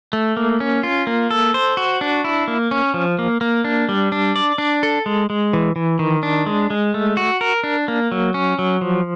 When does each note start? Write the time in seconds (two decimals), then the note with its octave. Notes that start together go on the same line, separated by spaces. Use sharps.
0.13 A3
0.37 A#3
0.60 C#4
0.83 F4
1.07 A#3
1.31 A4
1.54 C5
1.77 F#4
2.01 D4
2.24 E4
2.48 A#3
2.71 C#4
2.94 F3
3.19 A#3
3.41 A#3
3.64 D4
3.89 G3
4.12 D4
4.36 D5
4.58 D4
4.83 A4
5.06 G#3
5.30 G#3
5.53 E3
5.76 E3
5.99 D#3
6.23 D4
6.46 G#3
6.70 G#3
6.94 A3
7.17 F#4
7.41 A#4
7.64 D4
7.88 A#3
8.12 F#3
8.34 C#4
8.59 F#3
8.81 F3